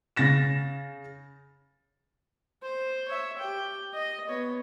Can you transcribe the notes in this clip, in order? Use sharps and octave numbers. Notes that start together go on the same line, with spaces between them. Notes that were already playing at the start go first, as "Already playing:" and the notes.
C#3 A6 A#6 E7
C5
C#5 E5
G4 G5
D#5
B3 C#5